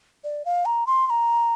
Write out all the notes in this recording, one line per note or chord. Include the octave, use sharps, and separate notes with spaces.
D5
F5
A#5
C6
C6
A#5